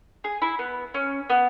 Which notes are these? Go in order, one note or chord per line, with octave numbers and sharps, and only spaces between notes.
G#4
E4
B3
C#4
B3